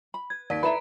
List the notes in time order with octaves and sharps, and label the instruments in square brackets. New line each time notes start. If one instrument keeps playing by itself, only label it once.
[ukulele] B5
[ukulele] B4 [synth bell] G#6
[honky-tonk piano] D#2 [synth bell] D5 B6 D7
[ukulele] E4 A4 E5 [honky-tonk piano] B4 E7 [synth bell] A#5 B5